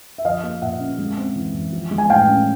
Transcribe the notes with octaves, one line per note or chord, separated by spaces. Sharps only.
E5
F3 D#5 F5
A#3
A#2 E5 F#5
C#4
G#3
C4
E3
E3
F3
G#3
G#5
A2 F5 G5
C#4